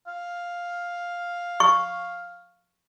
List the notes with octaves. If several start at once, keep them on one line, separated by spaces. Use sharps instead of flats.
F5
C#6